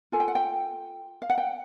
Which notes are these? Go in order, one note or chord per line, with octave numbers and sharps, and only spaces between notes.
F4 A4 G#5
G5
F#5
G5
F5
F#5
G5